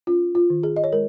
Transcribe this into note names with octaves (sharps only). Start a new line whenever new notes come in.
C#4 F4
F4
D#3
G#4
D#5
C#5
G#3 A#4